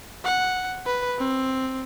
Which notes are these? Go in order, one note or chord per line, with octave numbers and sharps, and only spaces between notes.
F#5
B4
C4